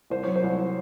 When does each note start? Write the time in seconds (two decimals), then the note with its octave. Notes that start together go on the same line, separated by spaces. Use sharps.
0.10 C2 C5
0.23 F#3 C#5
0.36 C5
0.44 C2